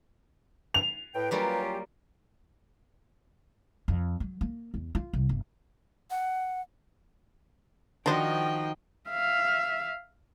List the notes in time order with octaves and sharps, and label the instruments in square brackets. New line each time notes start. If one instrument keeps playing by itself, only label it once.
[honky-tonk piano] F7
[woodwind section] A2 G5 [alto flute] B4
[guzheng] F#3 G3 A#3 [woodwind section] C#4 F4 G4
[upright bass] F2
F#3
A#3
E2
F4
C2
G1
[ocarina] F#5
[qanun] D#3 D#4 F#4 [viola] F3 D#5 [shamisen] D4 C5 [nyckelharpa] G5
[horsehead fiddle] E5 F5